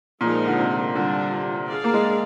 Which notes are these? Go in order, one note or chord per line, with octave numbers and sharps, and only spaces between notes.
A#2 F3 G#3 D#4 A#4
D3
C3
D3 G3 D4 F4
D4 G#4 D5 F5
A#3
G#3